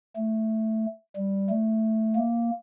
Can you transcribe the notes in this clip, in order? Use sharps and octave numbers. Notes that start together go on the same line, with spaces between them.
A3
G3
A3
A#3